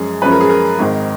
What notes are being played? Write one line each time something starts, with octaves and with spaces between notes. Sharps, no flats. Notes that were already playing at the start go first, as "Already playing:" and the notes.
Already playing: F#2 F3 G#3 C#4 G#4
F#2 F3 G#3 C#4 B4
A#4
G#4
A#4
G#1 G#2 D#3